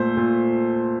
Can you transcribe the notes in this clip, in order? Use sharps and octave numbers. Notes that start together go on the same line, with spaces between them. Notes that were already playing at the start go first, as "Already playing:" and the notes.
Already playing: A#2 A3 C5
A#2